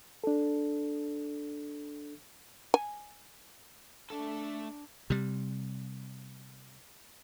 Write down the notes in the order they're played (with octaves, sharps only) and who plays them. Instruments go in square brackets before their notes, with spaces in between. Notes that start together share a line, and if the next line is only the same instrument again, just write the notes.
[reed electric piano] D4 A4
[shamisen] G#5
[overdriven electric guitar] A3 A4 [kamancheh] D4
[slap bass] C3 G3